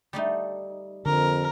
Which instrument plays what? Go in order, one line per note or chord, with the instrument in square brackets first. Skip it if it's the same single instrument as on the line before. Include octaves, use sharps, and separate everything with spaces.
[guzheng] G3 A3 D#4
[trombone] F2 [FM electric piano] D3 [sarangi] A#4